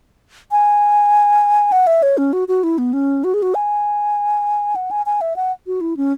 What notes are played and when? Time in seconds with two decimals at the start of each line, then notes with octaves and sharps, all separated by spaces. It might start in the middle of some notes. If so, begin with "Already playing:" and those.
0.51 G#5
1.72 F#5
1.87 E5
2.03 C#5
2.18 C#4
2.33 F#4
2.48 F#4
2.63 E4
2.78 B3
2.93 C#4
3.24 F#4
3.34 G#4
3.42 F#4
3.55 G#5
4.76 F#5
4.91 G#5
5.06 G#5
5.21 E5
5.36 F#5
5.67 F#4
5.81 E4
5.97 C#4